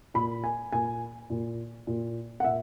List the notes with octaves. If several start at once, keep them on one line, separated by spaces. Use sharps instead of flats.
A#2 B5
G#5
A#2 G#5
A#2
A#2
F#5
A#2 E5